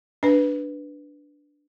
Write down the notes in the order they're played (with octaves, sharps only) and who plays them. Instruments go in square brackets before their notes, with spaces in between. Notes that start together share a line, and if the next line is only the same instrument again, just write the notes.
[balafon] D4 B4